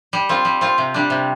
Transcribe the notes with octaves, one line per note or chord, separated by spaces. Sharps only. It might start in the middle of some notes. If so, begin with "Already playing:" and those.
G3
C4 F4
G3
C4 F4
C3
G3 D4
C3